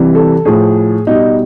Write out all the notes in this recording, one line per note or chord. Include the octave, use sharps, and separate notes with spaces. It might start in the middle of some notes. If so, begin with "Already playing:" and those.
Already playing: C3 E3 G3
A4
A2 F3 G#4
B2 G3 D#4